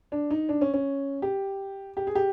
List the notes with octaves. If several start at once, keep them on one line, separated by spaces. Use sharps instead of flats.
D4
D#4
D4
C#4
C#4
G4
G4
G#4
G4